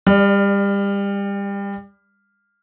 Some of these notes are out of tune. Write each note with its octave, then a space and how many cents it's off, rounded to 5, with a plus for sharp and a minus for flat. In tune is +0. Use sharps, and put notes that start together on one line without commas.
G3 +30 D5 +0